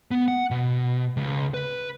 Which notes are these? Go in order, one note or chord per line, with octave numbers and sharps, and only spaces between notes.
B3
F#5
B2
C#2
B4